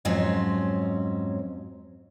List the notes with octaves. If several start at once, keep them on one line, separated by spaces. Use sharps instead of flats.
F2 G#2 F#3 C4 C#4